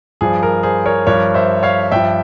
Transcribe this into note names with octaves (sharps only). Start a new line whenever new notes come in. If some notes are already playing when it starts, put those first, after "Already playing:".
G2 F3 G#4
A#4
G#4 C5
A#4 C#5
G2 F3 A#4 C#5
C5 E5
C#5 F5
G2 F3 E5 G5